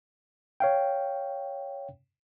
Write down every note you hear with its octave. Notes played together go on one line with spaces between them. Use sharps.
C#5 F5 G5